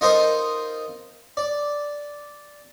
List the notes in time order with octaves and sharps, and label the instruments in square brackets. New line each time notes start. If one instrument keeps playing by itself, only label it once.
[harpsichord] D#4 F4 A4 A#4 C5 D#5
D5